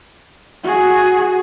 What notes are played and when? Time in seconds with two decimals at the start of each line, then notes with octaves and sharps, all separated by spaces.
0.64 F#4 G#4